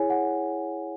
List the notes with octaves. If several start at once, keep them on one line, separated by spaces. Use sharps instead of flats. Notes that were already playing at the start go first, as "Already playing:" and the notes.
Already playing: E4 G#4 C#5 G#5
F#5